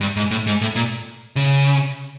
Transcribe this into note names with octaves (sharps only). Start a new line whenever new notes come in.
G2
G#2
A2
G#2
A2
A#2
C#3